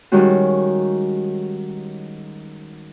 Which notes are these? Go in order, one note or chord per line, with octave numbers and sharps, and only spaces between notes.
D#3 G3 G#3 C#4 F#4